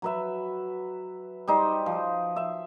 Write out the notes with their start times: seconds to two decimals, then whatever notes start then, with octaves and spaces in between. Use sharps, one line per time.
0.02 F#3 B4 E5
1.48 G3 D#4 C5
1.86 F3
2.36 E5